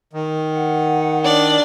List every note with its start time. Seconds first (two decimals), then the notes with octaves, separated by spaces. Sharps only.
0.13 D#3
0.51 F#5
1.24 D4 D5